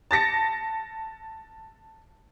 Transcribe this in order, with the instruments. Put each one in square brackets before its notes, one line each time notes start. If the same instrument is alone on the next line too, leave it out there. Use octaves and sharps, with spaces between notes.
[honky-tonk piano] A5 A6 A#6 C#7